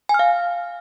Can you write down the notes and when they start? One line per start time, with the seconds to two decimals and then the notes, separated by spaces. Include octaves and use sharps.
0.09 G#5
0.14 F6
0.19 F5